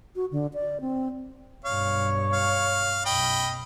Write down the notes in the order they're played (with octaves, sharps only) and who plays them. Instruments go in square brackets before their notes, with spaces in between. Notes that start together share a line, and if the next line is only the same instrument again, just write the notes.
[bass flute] F#4
D3
D5
C4
[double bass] B1 G2 [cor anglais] C#5 [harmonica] F5
[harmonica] F5
[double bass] B1 F#2 [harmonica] D#5 G5 B5